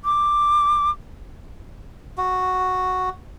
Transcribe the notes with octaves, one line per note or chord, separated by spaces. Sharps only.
D6
F#4